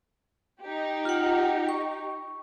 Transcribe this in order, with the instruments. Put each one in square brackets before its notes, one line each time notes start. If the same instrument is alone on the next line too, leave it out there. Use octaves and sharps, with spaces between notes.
[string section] D#4 G4
[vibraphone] F4 F#5
C#6